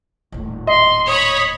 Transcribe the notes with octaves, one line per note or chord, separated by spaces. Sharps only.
D#1 A2
D#5 C6
C#5 B5 D#6